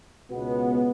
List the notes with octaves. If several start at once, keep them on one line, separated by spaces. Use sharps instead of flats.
C#2 B2 G#3 B3